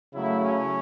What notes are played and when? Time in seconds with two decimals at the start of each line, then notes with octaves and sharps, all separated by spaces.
0.15 C#3 F#3 A3 E4
0.44 C#4